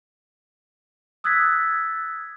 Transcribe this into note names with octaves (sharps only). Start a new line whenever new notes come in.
D#6 E6 F#6 G#6 A6 B6